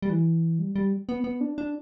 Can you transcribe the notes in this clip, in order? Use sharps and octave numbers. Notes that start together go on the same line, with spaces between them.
G3
E3
G3
G3
B3
B3
D4
D4